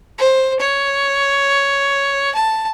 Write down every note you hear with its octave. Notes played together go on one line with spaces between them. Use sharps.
C5
C#5
A5